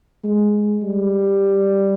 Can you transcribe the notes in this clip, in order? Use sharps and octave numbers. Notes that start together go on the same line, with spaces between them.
G#3
G3